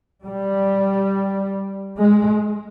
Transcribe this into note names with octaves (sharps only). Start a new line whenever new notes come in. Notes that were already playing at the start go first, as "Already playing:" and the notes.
G3
G#3